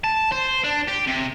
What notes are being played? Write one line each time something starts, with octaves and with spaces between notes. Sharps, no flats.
A5
C5
D4
G4
C3